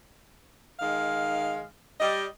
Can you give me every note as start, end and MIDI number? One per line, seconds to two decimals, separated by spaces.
0.80 1.63 51
0.80 1.63 56
0.80 1.63 77
2.00 2.25 55
2.00 2.25 75